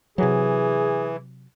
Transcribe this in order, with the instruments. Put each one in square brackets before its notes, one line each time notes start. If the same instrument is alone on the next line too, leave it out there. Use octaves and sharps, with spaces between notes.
[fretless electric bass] C3 F#3 [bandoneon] E3 [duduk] G#4